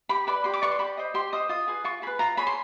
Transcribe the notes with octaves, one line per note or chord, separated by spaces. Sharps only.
G4 B5
B4 D5 B5
G4 C6
D6
B4 D5 C#6
C6
G4 B5
C5 D#5
G4 C6
C5 D#5 D#6
F4 D#6
G#4 B4
F4 C#6
G#4 B4 B5
F4 A#5
G#4 C#5 B5
C6